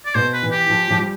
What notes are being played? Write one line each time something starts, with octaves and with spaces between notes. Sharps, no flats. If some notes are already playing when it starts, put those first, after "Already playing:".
D5
B2 C5
B4
E3
G4
F3
F3
G3